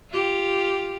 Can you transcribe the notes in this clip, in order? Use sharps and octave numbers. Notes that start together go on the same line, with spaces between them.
F4 G4